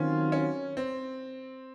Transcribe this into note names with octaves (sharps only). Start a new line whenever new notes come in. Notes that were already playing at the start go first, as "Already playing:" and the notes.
Already playing: D#3 F#3 C4 C#4 F4
C#4
C4